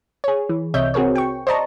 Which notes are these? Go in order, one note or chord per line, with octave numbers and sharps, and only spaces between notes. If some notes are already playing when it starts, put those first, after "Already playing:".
G#4 C#5
E3
C2 C3 C#5 D#5 E5 G6
C4 F#4 G#4 A#4 C#5
G5 C#6
C5 D5 D#5 A5 A#5 C#6